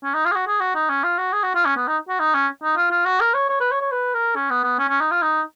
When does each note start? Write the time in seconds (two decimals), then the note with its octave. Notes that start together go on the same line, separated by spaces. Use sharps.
0.04 C#4
0.14 D#4
0.25 F4
0.32 G#4
0.35 F#4
0.47 G#4
0.60 F#4
0.75 D#4
0.90 C#4
1.04 F4
1.18 F#4
1.33 G#4
1.43 F#4
1.55 F4
1.65 C#4
1.76 B3
1.87 D#4
2.09 F#4
2.20 D#4
2.34 C#4
2.63 D#4
2.77 F4
2.91 F4
3.06 F#4
3.20 A#4
3.34 C#5
3.49 C#5
3.60 B4
3.71 C#5
3.81 C#5
3.91 B4
4.14 A#4
4.35 C#4
4.50 B3
4.64 B3
4.79 C#4
4.89 C#4
5.01 D#4
5.11 F4
5.22 D#4